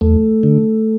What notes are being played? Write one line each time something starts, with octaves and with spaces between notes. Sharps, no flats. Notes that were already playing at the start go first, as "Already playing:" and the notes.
E2 A3
D3